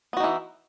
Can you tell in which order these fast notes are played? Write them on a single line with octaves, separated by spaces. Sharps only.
B3 F#4 D#4 E3